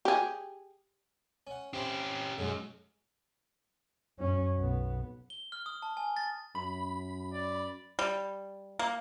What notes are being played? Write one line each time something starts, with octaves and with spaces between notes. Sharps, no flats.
G4 G#4
C#4 F#5
C4 C#4 E4 G4 B5
B1 F#2 F#3 G#3
F#2 C#4
B1 B3
G7
F6
D#6
A5
G#5
A6
F#2 B5
D5
G3
A#3